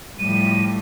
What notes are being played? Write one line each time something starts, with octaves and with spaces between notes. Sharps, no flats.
A2 F3 G3 A3 D#7